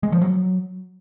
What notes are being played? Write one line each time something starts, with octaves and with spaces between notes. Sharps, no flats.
G#3
F3
F#3